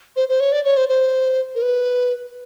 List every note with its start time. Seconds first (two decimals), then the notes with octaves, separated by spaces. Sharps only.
0.16 C5
0.29 C5
0.40 C#5
0.52 D5
0.65 C#5
0.77 C5
0.89 C5
1.55 A#4
1.62 B4